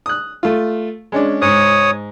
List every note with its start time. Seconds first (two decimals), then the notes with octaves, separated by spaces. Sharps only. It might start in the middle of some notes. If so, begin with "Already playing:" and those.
0.06 D#6 F#6
0.43 A3 F4
1.12 G#3 C#4 D4
1.42 G#2 C#5 D#6